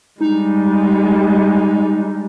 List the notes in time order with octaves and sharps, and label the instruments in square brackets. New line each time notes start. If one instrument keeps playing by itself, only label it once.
[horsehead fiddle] G3 G#3 [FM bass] D#4